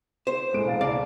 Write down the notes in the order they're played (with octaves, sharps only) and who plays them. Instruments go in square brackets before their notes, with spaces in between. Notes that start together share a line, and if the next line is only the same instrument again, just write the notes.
[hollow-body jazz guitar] C5
[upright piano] A2 G#3 D7
E1 F5 A6
[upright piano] C2 [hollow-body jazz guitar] D5 F5